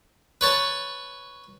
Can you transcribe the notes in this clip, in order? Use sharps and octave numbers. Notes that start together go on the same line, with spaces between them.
B4 C#5 A5